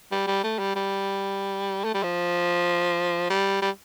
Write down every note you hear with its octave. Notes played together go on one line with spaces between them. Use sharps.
G3
G3
A3
G3
G3
A3
G3
F3
G3
G3